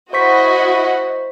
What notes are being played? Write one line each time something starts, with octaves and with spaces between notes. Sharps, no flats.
E4 F#4 C5 D#5 C#6 B6